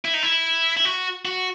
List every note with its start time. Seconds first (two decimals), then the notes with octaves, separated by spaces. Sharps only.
0.05 E4
0.14 D#4
0.23 E4
0.77 E4
0.85 F#4
1.25 F#4